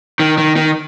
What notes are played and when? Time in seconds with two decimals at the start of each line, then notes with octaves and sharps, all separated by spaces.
0.20 D#3
0.38 D#3
0.56 D#3